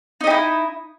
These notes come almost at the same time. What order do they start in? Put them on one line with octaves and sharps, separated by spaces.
D#4 D#5 G4 E4